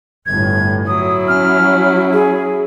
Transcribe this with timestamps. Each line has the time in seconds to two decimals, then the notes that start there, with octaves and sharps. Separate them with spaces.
0.26 G1 A2 G#6
0.87 F#3 E4 D#6
1.28 C#4 F6
2.13 G#4